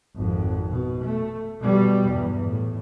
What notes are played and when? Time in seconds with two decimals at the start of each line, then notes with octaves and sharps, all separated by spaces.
0.16 G#1 F2
0.70 B2
1.04 A3
1.60 B2 G3
2.08 E2 G2
2.46 A2